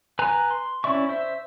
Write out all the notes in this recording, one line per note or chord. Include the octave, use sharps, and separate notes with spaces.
B4 G#5 A#5 F#6
C6
C#4 E4 D5 E5 C#6
C5 E5